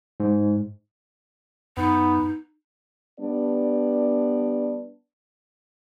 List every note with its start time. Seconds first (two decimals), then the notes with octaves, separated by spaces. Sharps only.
0.20 G#2
1.77 F#2 B3 D#4
3.20 G3 B3 D4 D5